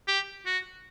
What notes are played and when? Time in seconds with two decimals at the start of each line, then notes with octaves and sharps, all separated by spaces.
0.08 G4
0.46 F#4